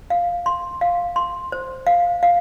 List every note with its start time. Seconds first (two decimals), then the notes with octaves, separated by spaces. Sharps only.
0.10 F5
0.46 C6
0.81 F5
1.16 C6
1.52 C5
1.87 F5
2.23 F5